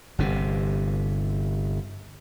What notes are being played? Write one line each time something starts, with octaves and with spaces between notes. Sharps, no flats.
G1 C3